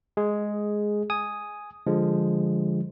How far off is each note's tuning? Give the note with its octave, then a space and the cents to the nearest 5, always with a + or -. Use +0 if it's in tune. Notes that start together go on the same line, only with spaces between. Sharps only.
G#3 +0 G#4 +5
G#5 +0 D#6 +0
D3 +0 F3 +0 G#3 -15